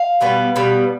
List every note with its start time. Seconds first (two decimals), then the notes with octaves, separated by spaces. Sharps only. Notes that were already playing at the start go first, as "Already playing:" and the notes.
Already playing: F5
0.21 B2 G3 B3
0.56 B2 G3 B3